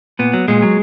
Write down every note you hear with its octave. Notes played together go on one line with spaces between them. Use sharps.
A#2 B3
F#3
A#2 G#3
F#3